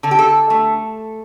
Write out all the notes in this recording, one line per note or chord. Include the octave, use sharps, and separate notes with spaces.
D3 A4
G4
A4
A3